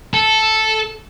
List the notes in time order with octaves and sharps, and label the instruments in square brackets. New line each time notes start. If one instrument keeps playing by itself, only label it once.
[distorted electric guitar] A4